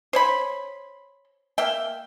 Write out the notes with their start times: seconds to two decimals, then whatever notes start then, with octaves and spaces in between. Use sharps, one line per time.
0.13 C5 C#5 B5
1.58 A#3 E5 G5